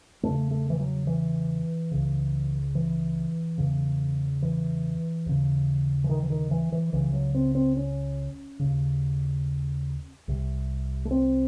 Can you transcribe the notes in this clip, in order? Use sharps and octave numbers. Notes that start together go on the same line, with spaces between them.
E2 C#3 A3
A3
E3
F#3
E3
C#2 C#3
E3
E2 C#3
E3
D#2 C#3
E3
D#3
E3
D#3
E3
E3
C#2 C#3 E3
F#3
C4
C4
C#4
D#2 C#3
C2 C3
A3
C4